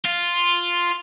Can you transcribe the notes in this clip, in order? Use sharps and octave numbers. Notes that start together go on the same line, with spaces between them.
F4